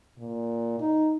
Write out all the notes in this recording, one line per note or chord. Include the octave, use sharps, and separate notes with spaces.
A#2
D#4